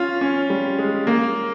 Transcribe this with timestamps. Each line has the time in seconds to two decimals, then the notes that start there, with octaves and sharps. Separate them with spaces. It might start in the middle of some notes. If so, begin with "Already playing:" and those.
Already playing: C#4 F4
0.21 C#4
0.50 G3
0.79 G#3
1.07 A#3